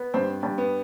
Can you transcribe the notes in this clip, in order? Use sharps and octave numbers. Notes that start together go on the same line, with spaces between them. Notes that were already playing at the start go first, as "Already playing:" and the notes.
Already playing: B3
G2 C4
G2
B3